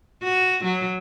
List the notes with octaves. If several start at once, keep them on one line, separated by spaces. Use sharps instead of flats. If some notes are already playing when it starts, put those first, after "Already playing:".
F#4
F#3